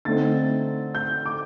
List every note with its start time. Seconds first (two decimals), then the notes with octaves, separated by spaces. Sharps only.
0.05 D3 A3 C4 D#4 A6
0.95 G6
1.26 D6